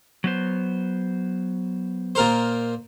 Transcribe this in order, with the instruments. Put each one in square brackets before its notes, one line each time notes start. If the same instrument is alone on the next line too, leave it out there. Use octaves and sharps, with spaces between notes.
[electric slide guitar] F#3 B3 C5
[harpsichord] A#2 A#4 C5